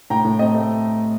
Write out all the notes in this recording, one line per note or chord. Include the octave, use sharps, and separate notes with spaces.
A2 G5 A#5
A2
C4 D#5 G5
A3